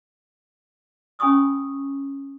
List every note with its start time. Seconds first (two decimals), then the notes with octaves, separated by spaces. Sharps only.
1.19 C#4 G#5 B5 C#6 D#6 E6